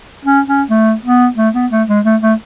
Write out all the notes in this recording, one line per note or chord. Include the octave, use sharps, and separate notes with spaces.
C#4
C#4
A3
B3
A3
B3
A3
G#3
A3
A3